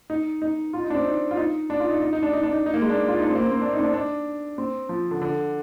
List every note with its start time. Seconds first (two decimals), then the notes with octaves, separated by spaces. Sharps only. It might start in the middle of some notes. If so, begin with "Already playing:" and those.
0.10 D#4
0.42 D#4
0.73 F4
0.84 D#4
0.90 D4
0.95 C4
1.05 D#4
1.31 F4
1.37 D#4
1.70 D4
1.80 F4
1.91 D#4
2.01 D#4
2.13 D#4
2.23 D4
2.33 D#4
2.43 D4
2.53 D#4
2.66 D#4
2.74 A#3
2.82 G#3
2.89 D4
3.08 F4
3.19 D#4
3.25 D4
3.30 C4
3.35 A#3
3.41 C4
3.51 C4
3.62 D4
3.73 D#4
3.79 C4
3.83 D4
3.94 D4
4.58 C4
4.89 F3
5.11 D3
5.22 D3